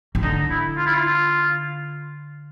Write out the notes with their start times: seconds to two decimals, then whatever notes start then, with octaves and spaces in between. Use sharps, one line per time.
0.15 D#3
0.22 D3 D#4
0.50 E4
0.77 F4
0.86 E4
0.95 F4